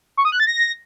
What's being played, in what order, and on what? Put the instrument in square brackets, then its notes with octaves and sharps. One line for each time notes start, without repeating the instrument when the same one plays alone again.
[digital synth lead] C#6
D#6
F#6
A6
A#6